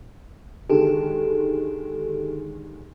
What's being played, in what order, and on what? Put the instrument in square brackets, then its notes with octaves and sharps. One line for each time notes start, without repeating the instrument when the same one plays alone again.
[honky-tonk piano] D3 D#3 G#3 [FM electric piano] G4 A4